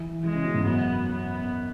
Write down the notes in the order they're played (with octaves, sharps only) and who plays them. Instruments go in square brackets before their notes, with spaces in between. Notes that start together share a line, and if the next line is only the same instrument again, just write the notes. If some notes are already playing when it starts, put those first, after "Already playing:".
Already playing: [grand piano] E3
[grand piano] E3 [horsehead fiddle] G#3
[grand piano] C#3
B2
G#2
[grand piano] F#2 [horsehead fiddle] B3
[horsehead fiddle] B3